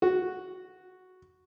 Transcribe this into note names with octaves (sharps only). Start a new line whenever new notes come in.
F#4